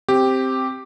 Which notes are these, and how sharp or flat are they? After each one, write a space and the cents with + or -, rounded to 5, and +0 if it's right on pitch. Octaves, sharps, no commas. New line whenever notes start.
C4 +5 G4 +0